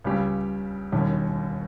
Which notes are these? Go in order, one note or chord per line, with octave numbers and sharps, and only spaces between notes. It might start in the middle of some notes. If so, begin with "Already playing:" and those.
C#2 C#3 G3 C#4 G4
E1 D#2 D#3 G3 C#4